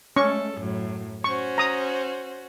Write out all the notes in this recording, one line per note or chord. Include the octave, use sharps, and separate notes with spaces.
G#3 A3 C#4 A4 C#6
F#2 A2 F#3
C#4 F#4 C5 C#6
A#5 D#6